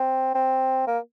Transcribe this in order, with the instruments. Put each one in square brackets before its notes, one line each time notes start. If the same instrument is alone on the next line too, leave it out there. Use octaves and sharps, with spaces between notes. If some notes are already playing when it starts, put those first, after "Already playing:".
Already playing: [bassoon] C4
C4
A#3